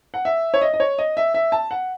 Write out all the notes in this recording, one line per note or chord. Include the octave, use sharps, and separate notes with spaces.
F#5
E5
C#5
D#5
D#5
C#5
D#5
E5
E5
A5
F#5